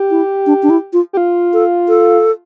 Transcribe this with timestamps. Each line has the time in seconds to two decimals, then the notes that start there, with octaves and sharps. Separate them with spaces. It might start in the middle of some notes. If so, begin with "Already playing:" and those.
Already playing: G4
0.11 E4
0.46 D4
0.63 D4
0.70 E4
0.93 F4
1.13 G4
1.17 F4
1.53 A4
1.88 A4